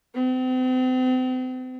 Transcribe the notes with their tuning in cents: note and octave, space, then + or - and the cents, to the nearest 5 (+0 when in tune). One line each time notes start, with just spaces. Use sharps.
C4 -40